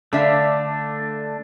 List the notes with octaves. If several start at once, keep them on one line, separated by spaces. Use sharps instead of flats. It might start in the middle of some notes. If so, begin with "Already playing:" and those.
D3 A3 D4 E5 F5